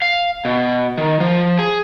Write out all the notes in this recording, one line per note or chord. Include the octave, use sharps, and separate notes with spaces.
F5
B2
D#3
F3
G#4